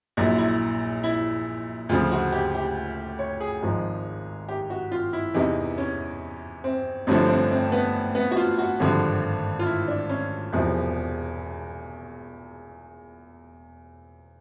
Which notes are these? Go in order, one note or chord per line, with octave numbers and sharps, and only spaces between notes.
A#1 A#2 F#3 E4
E4
E4
D2 C#3 F3 F4
F#4
G4
G4
C#5
G#4
G#1 G#2 F3
G4
F#4
F4
E4
E2 C3 E3 D#4
C#4
C4
A1 G2 D3 F3 C4
C4
C4
B3
B3
F#4
F4
F#4
G#1 G2 D3 F3
F4
E4
D4
C#4
E1 E2 C3 F3